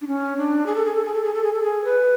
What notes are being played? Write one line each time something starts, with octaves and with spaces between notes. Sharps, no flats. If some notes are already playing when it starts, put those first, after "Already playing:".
D4
C#4
D4
G#4
A4
G#4
A4
G#4
A4
G#4
A4
G#4
A4
G#4
B4